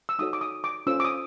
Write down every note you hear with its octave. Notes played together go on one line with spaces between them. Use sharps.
E6
D#4 F#4 A4 C#5 D#6
D6
D#6
D6
C#4 F4 A4 C5 E6
D6
D#6